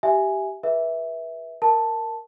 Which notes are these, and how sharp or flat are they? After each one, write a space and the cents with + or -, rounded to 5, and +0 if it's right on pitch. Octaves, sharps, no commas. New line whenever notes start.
G4 -15 E5 +0 G#5 +0
G#4 +0 B4 -25 E5 -10
A#4 -5 A5 +0